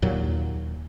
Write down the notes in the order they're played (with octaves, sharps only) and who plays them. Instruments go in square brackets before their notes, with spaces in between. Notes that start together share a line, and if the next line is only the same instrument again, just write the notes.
[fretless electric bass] D#2 A#2 F#3